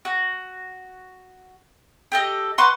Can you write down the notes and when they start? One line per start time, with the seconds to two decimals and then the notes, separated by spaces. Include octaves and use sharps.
0.05 F#4
2.12 G4 A4 D#5
2.58 B4 F#5 C6 C#6